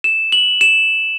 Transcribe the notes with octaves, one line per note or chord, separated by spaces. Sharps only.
E7
F#7
E7